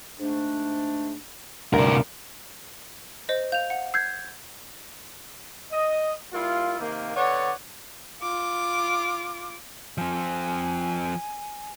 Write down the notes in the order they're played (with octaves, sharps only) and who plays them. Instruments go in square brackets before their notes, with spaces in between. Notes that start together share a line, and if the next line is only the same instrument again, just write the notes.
[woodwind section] G#2 A3 D4
[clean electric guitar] D2 G2 [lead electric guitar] C3 A#4 [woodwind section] G3 D#4
[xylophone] C5 D#5
[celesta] F5 F7 [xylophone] G6
[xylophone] F#5
[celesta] E6 G6 G#6 [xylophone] C7
[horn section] D#5
G3 A#3 E4 F4
C3 D#3 A#3
D3 B3 C#5 D5 F#5
[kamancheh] F4 D6
[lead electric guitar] F3 C4 [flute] G#5